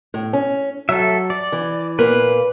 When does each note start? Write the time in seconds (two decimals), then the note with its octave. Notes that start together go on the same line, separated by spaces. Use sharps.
0.14 A2
0.33 C#4
0.89 F#3 A4 E5
1.30 D5
1.52 E3
1.99 A#2 A#3 B4